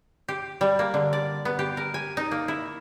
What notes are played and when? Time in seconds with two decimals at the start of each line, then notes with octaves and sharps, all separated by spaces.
0.28 G4
0.61 G3
0.79 A#3
0.94 D3
1.13 D5
1.45 B3
1.59 G4
1.77 A#4
1.94 G#5
2.17 D#4
2.31 A#3
2.48 E4